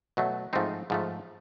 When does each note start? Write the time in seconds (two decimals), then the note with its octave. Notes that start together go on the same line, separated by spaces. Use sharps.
0.17 B2 F#3 A3
0.53 G#2 F3 A3 C4 D#4
0.90 G#2 F3 A3